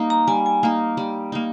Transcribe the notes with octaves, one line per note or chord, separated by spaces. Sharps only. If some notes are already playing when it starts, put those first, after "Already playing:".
Already playing: G3 A#3 D#4
A#5
G3 G#5
G#5
A#3 D#4
G3
A#3 D#4